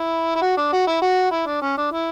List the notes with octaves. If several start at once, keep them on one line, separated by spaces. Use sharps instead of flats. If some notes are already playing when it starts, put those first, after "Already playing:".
Already playing: E4
E4
F#4
D4
F#4
E4
F#4
E4
D4
C#4
D4
E4